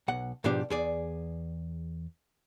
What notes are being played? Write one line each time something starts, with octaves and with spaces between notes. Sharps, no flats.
B1 F#5
G#2 B2 F3 D4 G4
E2 G#4 D5